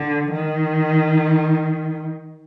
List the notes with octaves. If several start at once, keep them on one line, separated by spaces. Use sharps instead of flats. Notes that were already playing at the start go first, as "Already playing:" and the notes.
Already playing: D3
D#3